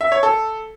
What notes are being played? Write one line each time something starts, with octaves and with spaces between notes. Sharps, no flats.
E5
C#5
A4